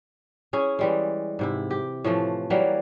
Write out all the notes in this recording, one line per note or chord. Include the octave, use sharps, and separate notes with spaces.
C#4 E4 G#4
E3 G3 G#3
G#2 C3 E4
G4
A2 E3 F3 A3
E3 F#3 G3 A#3